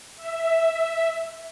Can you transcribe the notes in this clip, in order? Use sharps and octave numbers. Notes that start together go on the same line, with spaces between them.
E5